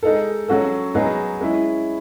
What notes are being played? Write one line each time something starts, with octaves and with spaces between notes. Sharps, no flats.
G#3 D#4 A4
F#3 C#4 F#4 A4
F#3 B3 D#4 G#4
G#3 C#4 E4